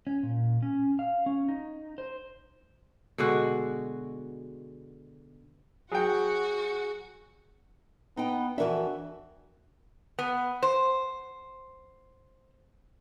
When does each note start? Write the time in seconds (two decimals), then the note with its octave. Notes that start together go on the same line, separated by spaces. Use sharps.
0.07 C#4
0.23 A#2
0.62 C#4
0.99 F5
1.26 C#4
1.48 D#4
1.98 C5
3.18 B2 D3 G#3 F#4
5.92 F#3 F#4 G#4 F#5 G5
8.17 B3 D#4 G5
8.58 F2 E3 D4 F#4 A#4 E5
10.19 B3
10.63 C5